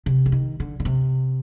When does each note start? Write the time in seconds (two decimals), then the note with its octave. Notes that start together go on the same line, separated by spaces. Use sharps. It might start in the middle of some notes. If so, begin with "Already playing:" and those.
0.06 C3
0.26 D3
0.32 D#3
0.60 D3
0.80 D3
0.85 C3